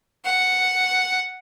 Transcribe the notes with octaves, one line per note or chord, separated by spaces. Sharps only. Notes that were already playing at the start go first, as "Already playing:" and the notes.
F#5